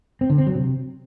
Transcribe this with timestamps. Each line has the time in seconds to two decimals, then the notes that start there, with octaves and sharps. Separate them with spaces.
0.21 C4
0.30 D3
0.38 C4
0.47 F#3
0.55 C3